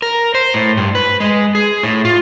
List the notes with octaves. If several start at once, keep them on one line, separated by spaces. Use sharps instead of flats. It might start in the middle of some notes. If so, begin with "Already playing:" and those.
A#4
C5
A2
G2
B4
G#3
G#4
A2
F4